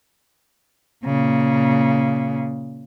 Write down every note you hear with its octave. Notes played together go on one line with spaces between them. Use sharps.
A#2 C#3